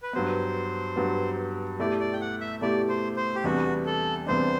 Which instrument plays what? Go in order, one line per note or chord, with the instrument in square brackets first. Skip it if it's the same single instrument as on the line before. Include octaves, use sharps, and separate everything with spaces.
[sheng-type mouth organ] B4
[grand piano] G2 F#3 B3 [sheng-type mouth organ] C5
[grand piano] G2 F#3 B3
[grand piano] B2 A3 E4 G4 [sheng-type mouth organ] D5
[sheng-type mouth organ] D5
G5
F#5
E5
[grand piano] B2 A3 E4 G4 [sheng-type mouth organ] D5
[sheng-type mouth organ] C5
C5
G4
[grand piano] E2 C3 G3 B3 D4 [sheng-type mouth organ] F#4
[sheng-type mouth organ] A4
[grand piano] E2 C3 G3 B3 D4 [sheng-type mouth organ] C5